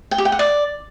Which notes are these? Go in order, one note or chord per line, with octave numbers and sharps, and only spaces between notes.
G5
G4
G5
F#5
D5